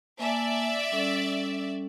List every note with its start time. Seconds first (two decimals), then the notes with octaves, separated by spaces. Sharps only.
0.19 A#3 D5 E5 G#5 A5
0.92 G3 C#4 A4